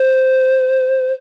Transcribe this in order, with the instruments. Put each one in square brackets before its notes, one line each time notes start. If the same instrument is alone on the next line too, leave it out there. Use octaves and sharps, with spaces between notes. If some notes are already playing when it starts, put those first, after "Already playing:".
Already playing: [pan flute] C5